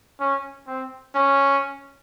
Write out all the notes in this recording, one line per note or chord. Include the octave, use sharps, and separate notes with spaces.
C#4
C4
C#4